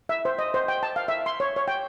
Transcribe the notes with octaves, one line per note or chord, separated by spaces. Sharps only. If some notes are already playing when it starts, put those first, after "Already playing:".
E5
C5
D#5
C5
G5
A5
F5
E5
C6
C#5
C#5
G5